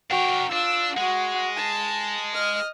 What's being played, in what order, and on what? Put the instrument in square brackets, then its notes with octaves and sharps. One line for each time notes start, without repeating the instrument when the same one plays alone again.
[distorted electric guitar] D4 A#4 [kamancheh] F#4 G5
[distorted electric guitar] D4 [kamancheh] F4 E6
[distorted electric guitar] G#3 [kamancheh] F#4 F#5
[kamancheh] A5
D#5 F6